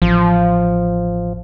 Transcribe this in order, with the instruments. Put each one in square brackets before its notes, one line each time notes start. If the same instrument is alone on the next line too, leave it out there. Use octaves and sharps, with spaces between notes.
[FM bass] A1 [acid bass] F3